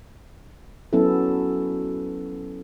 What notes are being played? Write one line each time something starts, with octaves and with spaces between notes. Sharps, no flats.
F#3 B3 C#4 E4 A4